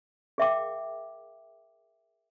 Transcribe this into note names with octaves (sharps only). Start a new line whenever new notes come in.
G#4 A#4 E5 F5 G5 D6